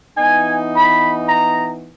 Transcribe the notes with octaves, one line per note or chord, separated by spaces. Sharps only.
E3 B3 D#4 G#5
B5
A#5